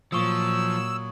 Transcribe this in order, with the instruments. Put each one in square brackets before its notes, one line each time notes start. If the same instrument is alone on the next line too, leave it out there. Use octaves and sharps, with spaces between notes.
[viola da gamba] A#2 F#3 [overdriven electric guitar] F3 [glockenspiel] C#6 D#6 [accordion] E6